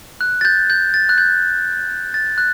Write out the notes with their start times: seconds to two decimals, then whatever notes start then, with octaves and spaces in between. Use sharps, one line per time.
0.21 F#6
0.41 A6
0.45 G6
0.70 G6
0.94 A6
1.09 F#6
1.18 G6
2.14 A6
2.38 F#6